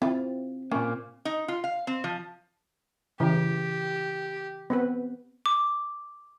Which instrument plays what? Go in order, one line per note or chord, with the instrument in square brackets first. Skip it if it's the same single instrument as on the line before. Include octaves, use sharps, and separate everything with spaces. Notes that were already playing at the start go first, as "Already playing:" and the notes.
[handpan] C4 [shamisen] E4 F4
[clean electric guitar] A#2 A#3 [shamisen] C#4
[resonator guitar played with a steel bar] D#4
F4
F5
C4
F3
[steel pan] C#3 E3 [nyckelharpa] G4
[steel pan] B3 C4 B4
[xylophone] D6